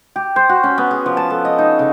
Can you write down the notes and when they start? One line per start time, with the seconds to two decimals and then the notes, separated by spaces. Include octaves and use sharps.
0.16 G4
0.36 C5
0.49 F#4
0.63 C#4
0.78 B3
0.91 G#4
1.06 F3
1.17 A5
1.30 A4
1.45 D#5
1.58 D#4
1.79 C#3